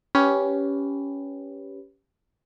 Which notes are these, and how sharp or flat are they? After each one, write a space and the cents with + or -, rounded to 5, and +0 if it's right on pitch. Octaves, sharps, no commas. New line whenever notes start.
C#4 +10 G4 +0 B4 +0